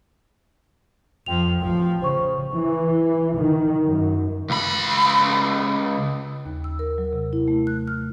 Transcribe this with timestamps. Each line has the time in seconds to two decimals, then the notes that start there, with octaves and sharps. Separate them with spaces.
1.26 F2 F3 G5 F7
1.61 A1 F3 G5
2.02 C#3 C5 C#6
2.52 E3
3.35 D#3
3.87 F#2
4.50 C#2 B5
6.46 D#2
6.64 E6
6.79 A#4
6.98 F#3
7.13 C3
7.33 E4
7.48 A3
7.67 F#6
7.88 F6